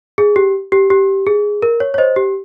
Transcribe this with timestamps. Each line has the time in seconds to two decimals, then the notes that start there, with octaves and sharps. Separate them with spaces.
0.18 G#4
0.36 G4
0.72 G4
0.90 G4
1.27 G#4
1.62 A#4
1.80 C#5
1.94 C#5
1.98 C5 D#5
2.16 G4